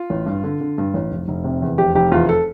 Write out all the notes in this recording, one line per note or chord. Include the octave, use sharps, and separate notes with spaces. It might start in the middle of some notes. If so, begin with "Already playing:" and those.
Already playing: F4
A1
G2
D3
D3
G2
A1
F1
F1
C3
E2
F1 G4
F1 G4
E2 F4
A4